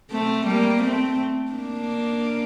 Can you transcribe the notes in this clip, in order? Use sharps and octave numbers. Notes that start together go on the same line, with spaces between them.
A3 C4
G3 A#3
A3 C4
A#3 D4